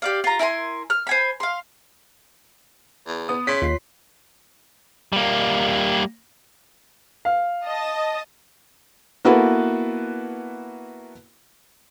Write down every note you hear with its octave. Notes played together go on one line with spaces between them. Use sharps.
G4 D5 F5
F4 A#5
E4 A#4 G#5 C6
F6
C5 G#5 B5
F5 C6
E2
B3 D#6
C#3 C#5 C6 B6
D#2 F4 C7
G3 A#3
F5
D#5 A5
A#3 B3 E4 F#4 A4 B4